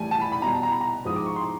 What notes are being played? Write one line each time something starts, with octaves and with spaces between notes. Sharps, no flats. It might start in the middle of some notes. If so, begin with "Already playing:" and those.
Already playing: A2 E3 G3 G#5 A5
A5
B5
B5
B2 G3 A#5
A5
A#5
B5
A#5
G#2 F3 D#6
D6
C#6
C6